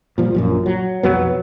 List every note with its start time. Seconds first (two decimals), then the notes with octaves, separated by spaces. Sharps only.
0.18 A#2 F3 G3
0.35 A#1 F#2 A#2
0.66 F#3
1.03 B1 F2 F#3 B3